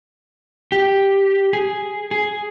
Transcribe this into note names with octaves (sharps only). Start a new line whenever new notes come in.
G4
G#4
G#4